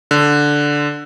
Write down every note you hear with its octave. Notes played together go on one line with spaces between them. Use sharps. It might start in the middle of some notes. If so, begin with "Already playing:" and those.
D3